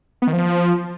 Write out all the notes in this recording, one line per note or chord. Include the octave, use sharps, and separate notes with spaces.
B3
D#3
F3